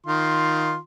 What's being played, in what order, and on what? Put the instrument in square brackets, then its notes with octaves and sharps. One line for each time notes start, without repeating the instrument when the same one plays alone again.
[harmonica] D#3 F4 C6